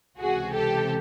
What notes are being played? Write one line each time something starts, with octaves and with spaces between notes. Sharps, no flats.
C#2 C3 E3 F#4 G#4
G4 A4